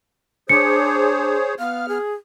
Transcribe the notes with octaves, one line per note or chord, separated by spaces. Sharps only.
D4 G#4 C5 C#5 C#7
B3 F5 F6
G#4